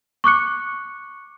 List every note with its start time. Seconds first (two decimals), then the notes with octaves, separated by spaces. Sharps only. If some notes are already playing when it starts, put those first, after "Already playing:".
0.24 C#6 D6 F#6 C#7